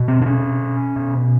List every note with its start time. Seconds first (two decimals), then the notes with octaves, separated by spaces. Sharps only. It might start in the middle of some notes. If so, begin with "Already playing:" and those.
Already playing: B2
0.08 C4
0.22 D4
0.26 C#4
0.96 B2